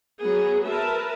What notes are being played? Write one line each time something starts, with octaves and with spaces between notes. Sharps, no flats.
F#3 B3 G#4
A#4 B4 E5 A5